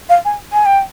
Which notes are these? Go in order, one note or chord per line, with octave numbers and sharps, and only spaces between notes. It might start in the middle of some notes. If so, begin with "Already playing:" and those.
F5
G#5
G#5
G5